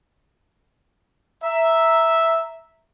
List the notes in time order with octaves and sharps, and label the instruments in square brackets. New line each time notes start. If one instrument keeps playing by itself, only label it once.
[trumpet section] E5 A#5